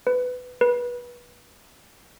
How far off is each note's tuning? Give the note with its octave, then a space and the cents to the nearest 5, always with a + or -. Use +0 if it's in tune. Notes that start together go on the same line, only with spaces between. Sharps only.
B4 +15
B4 -25